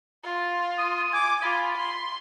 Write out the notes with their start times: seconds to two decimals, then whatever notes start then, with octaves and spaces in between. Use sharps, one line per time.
0.24 F4
0.78 D#6
1.13 G#5 D6
1.42 F4 B5
1.77 C6